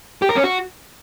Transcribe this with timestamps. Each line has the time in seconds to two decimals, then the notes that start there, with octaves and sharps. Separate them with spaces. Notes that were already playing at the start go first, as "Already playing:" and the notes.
0.22 G4
0.29 A#4
0.36 C#4
0.44 F#4